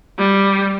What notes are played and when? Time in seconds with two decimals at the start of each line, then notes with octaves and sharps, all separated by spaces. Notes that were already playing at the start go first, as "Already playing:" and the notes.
0.18 G3